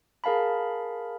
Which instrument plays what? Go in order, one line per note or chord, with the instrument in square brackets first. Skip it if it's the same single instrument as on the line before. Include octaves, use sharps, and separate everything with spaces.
[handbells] G#4 A#4 F5 A5 B5